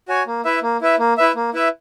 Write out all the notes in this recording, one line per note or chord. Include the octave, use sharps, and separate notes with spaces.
F#4 C#5 G#5
A#3
E4 B4 E5
A#3
E4 B4 E5
A#3
E4 B4 E5
A#3
E4 B4 E5